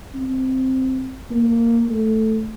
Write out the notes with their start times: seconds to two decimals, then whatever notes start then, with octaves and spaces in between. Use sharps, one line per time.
0.15 C4
1.30 A#3
1.89 A3